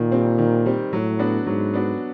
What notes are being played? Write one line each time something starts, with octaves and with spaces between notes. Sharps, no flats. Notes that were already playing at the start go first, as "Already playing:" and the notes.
Already playing: A#2 D#3
G3 C4
D#3
G3 C4
A2 F#3
B3 D4 F#4
G#2 F#3
B3 D4 F#4